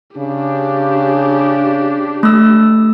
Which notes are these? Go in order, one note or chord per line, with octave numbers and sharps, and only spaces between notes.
C#3 D4 G4
A3 E6